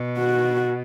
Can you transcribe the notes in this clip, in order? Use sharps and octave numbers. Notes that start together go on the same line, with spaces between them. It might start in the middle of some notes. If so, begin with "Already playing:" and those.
Already playing: B2
F#4